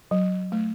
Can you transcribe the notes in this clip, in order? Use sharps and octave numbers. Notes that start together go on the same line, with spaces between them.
F#3
A3